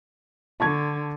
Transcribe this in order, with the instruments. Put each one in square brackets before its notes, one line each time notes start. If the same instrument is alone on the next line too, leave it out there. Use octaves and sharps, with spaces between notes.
[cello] D3 [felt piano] A5 C#6 G#6